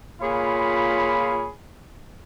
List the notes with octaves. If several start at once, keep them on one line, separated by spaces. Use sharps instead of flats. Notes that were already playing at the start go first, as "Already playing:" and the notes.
A#2 F4 G#4 C#5 B5